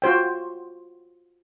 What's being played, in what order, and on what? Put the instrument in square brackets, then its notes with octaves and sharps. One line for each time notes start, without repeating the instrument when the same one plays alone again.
[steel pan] F4 F#4 C5 G5